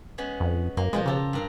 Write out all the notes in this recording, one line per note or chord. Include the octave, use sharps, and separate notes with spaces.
G#3 B3 C#4
F2
F#2 A#3
B2 F3 G#3 F4
C#3 G4 A4 A#4
G2 A#4 F5